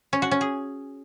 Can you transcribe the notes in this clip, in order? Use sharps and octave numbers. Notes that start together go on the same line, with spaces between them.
C#4
F#4
C#4
G#4